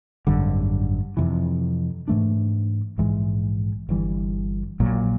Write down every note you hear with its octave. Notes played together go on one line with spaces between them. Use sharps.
G#1 F#2 D3 G3
F2 C3 E3
G#2 E3 A3 D4
A#1 G#2 E3 G#3
G1 G2 E3 G3
A#1 A#2 F#3